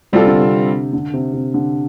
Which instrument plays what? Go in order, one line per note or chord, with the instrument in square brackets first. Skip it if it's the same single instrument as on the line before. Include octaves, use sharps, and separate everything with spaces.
[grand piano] C3 [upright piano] G3 C4 F4 A4
[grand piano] D3
C3
D3
C3
C3
D3